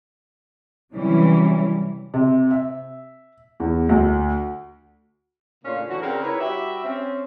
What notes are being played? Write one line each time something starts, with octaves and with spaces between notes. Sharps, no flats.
C3 E3 F#3 G3 C#4
C3
E5
E2
D2
A2 C#3 A#3 C#4 D4 F4
D3 E3 F#3 F#4
C#3 C4 D4 A#4
D#4 E4 B4 C#5
G3 F#4 G4 E5
C4 C#4